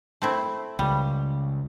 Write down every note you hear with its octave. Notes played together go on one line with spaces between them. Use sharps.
A3 C4 E4
C#2 G3